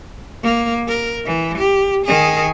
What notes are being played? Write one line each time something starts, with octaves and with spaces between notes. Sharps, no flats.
A#3
A#4
E3
G4
D#3 G#4